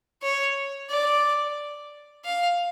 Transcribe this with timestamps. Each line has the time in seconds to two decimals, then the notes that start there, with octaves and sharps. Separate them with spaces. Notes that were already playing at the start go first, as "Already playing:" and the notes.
0.23 C#5
0.90 D5
2.25 F5